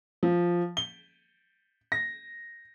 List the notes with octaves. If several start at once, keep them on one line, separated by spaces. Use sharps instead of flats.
F3
G7
A#6